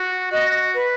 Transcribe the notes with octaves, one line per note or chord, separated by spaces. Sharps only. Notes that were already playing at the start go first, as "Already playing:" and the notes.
Already playing: F#4
F#4 D#5
B4